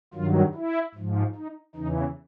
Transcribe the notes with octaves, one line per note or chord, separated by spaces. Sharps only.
G2 D#3 F#3 F4
E4
G#2 F3
D#4
E2 C#3 E3 D#4